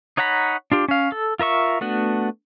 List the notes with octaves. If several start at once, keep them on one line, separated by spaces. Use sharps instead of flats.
D#4 C#5 F#5 A#5 B5
D4 F4 G4
C#4 F5
A4
F4 A#4 E5 C#6
A3 B3 D4 F#4